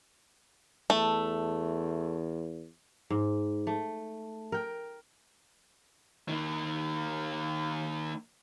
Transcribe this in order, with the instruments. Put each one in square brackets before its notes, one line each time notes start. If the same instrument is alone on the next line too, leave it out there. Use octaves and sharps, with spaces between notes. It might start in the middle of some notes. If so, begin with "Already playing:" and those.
[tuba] E2 [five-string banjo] A3
[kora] G#2
A3
A#4 G5
[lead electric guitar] D#3 A#3